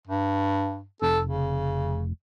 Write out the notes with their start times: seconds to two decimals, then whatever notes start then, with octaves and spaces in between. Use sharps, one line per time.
0.07 G2
1.02 F1 A4
1.26 C#3